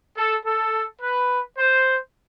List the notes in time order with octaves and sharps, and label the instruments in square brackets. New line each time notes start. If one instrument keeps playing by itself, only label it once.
[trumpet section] A4
A4
B4
C5